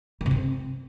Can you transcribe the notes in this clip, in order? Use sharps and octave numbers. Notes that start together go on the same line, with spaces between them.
D#3
C3
C4